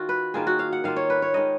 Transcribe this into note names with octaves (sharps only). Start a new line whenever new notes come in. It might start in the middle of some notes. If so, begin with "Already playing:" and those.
Already playing: D#3 F4 F#4
B4
D#3 A#3 F4 G#4
F#4
F5
F#5
D#3 A#3 F4 F5
C#5
B4
C#5
D#3 G#3 D#4 D#5